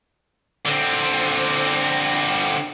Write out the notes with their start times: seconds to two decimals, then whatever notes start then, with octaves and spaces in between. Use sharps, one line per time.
0.66 D3 C4